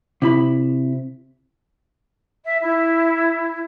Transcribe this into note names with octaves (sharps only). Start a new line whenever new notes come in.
C3 E4 B5
E5
E4